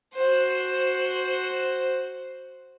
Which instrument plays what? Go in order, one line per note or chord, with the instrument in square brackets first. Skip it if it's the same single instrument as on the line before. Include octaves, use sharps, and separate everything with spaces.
[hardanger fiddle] F#4 C5